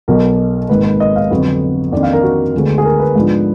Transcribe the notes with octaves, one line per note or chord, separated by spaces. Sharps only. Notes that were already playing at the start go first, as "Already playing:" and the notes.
B1 B2 F#3 A#4
G#1 G#2 D#3 A#3 B4
B4
D#5
F5
F2 D3 F#3 B3
F2 D#3 A#3 D4 D5
F5
A#4
F#4
D2 D3 G#3 B3
G#4
A#4
B4
G#2 F3 B3 D4